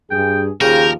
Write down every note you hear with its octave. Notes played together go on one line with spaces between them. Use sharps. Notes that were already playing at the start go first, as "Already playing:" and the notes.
G2 G#4 G5
D#2 C#3 F3 G4 A#4 G5